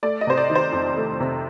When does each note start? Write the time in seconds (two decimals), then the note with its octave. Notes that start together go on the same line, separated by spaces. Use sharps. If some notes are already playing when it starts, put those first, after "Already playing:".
0.03 A3 D5
0.21 D#5
0.27 C3 C5
0.37 D5
0.50 D#3
0.55 C5
0.72 F2
0.97 A3
1.20 C3